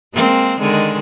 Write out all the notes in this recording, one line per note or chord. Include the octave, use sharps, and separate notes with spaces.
G#3 A#3 C4
D3 D#3 G#3